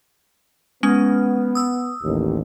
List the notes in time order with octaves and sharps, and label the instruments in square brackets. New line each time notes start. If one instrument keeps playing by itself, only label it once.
[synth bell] G#3 C#4 F6 [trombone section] B3
[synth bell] D#6 E6
[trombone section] A1 D#2